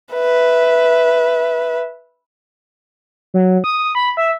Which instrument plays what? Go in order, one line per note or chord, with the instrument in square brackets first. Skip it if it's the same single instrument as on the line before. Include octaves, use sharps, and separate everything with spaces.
[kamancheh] B4 E5
[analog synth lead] F#3
D#6
B5
E5